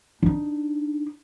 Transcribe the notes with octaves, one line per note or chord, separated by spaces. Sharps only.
D4 D#4